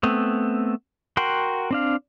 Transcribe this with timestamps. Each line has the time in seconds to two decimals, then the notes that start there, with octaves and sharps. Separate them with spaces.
0.03 A3 B3 C4
1.17 F#4 A#4 F#5 G5 C6
1.71 C4 D4 F5